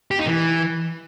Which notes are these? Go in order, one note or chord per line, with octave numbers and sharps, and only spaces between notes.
G4
D#4
E3